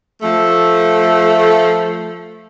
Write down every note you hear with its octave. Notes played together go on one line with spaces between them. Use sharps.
F3 A3